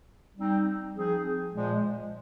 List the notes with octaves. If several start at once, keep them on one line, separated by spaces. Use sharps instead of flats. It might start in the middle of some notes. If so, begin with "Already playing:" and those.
G3 C4 D#4
F3 C4 D#4 G#4
A#2 F3 G#3